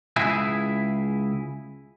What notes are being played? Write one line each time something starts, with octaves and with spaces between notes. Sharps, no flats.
C#2 E4 G#4 E5